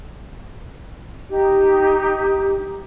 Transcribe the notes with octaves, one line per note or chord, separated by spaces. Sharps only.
D#4 G4